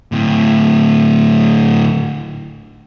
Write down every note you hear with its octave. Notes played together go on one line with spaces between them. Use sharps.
D2 A2